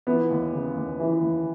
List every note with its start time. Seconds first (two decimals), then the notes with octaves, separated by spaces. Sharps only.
0.07 E3 B3
0.31 D#2
0.53 C#3
0.76 D#2
1.00 E3
1.22 D#2